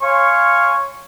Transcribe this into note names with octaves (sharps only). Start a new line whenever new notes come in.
C#5 F5 G#5 C6 C#6